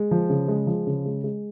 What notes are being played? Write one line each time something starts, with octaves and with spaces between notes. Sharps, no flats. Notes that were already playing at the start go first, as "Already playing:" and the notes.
Already playing: G#3
F3
C#3
G#3
F3
C#3
G#3
G#3